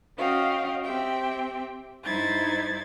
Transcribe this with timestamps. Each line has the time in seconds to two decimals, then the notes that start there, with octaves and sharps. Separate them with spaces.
0.17 C#4 F#4 D#5 F5 G5
0.83 C4 G4 E5 G5
2.04 G2 D#4 E4 C5 G#6 A6